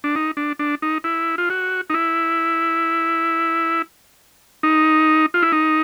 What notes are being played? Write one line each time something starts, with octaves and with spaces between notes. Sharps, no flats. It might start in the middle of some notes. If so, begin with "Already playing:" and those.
D4
D#4
D4
D4
D#4
E4
F4
F#4
D#4
E4
D#4
F4
E4
D#4